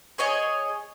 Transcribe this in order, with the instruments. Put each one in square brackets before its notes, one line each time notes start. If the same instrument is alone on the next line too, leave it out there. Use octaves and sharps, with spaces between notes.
[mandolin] G#4 C#5 D#5 G#5